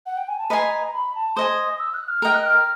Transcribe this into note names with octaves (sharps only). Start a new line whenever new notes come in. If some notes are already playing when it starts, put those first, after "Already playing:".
F#5
G5
G#5
A5
B4 D#5 G#5 A#5 C6
A#5
B5
A5
C5 D#5 G#5 D#6
E6
F#6
F6
A#4 D#5 G5 F6
F#6
F6